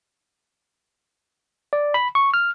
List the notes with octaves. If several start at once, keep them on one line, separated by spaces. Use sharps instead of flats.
D5
B5
C#6
F6